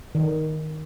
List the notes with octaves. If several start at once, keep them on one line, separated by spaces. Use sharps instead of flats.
D#3